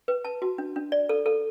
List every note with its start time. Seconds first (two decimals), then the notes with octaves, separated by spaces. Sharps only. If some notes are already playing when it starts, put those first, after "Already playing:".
0.08 B4
0.25 A5
0.42 F#4
0.58 D4
0.76 D4
0.92 D5
1.09 A4
1.26 A4